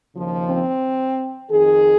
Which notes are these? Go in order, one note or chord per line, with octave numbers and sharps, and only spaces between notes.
D#2 C#3 F3
C4
F2 D#3 G#4